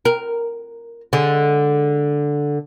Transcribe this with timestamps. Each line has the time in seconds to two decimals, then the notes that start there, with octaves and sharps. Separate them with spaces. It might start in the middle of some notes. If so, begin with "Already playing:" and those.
0.05 A#4
1.13 D3 G#3